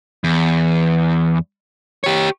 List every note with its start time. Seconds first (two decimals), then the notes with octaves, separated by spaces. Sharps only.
0.24 E2
2.04 G4 C#5